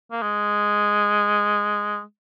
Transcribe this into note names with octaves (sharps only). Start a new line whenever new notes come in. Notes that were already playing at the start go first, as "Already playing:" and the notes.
A#3
G#3